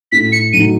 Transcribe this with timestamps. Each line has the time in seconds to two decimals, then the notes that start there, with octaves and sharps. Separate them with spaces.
0.12 A2 B6
0.32 C#7
0.53 F#3 A3 D#4 D#7